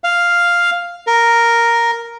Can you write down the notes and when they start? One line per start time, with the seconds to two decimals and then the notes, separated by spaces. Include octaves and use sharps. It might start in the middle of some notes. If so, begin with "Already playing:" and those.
0.04 F5
1.07 A#4